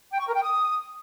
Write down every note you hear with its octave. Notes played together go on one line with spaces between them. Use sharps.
G5
C#6
A#4
G5
D#6